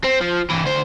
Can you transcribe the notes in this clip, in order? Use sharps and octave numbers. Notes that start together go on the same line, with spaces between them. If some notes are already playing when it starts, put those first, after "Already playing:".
C4
F3
G2 E3
D2 C5